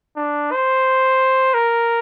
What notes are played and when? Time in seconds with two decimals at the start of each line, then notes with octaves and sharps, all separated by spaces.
0.16 D4
0.51 C5
1.54 A#4